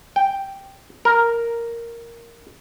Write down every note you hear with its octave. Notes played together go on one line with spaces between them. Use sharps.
G5
A#4